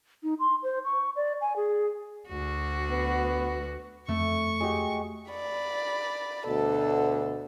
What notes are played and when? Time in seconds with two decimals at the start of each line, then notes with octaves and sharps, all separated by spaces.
0.23 D#4
0.40 C6
0.63 C5
0.85 C#6
1.16 D5
1.41 G#5
1.56 G#4
2.29 D2 F#4
2.91 B3
4.09 F2 A3 C#6
4.60 G#3 F#4 G4
5.31 D5 B5
6.47 D2 B2 A4